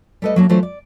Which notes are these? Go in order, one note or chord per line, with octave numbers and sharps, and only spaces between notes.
G3 A3 A4 B4 D#5
F#3 A#3 C4 D4
E3 F#3 A3 D4 F4 C5
D5